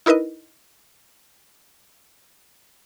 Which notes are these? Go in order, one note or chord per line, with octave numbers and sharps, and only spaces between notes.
D#4 E4 A#4 B4 D#5